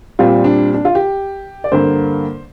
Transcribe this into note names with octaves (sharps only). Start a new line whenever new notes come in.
A#2 G3 C4 F4
D4
D4
F4
G4
D5
G2 D3 A#3 C5